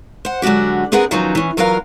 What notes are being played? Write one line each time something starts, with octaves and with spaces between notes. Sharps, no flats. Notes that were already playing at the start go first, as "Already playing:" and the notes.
C5 F#5
D3 F#3 G#3 F#4 G4
B3 C4 G#4 A#4 B4 F#5
D#3 F3 F#3 B3 C#4 D#4
E3 C#4
E2 F#3 F4 A#4 B4 F5